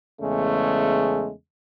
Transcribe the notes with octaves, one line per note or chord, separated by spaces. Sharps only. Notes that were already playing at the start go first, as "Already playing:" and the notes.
E2 C#3 G#3 A3